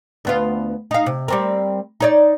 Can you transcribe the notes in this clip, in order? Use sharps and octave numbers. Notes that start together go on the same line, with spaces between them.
D2 B3 F4
D#4 F5
C3
G3 C4 A#4
D#4 C#5 D5